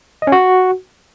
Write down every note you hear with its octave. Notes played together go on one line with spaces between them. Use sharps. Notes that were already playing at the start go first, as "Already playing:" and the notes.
D#5
C#4
F#4